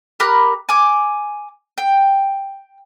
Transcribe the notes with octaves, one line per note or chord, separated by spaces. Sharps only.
G4 A#4 B5 F#6
G#5 D6
G5